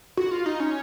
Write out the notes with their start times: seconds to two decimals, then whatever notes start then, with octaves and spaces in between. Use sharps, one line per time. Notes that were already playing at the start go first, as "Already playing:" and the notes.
0.17 F#4
0.31 F4
0.46 D#4
0.60 C#4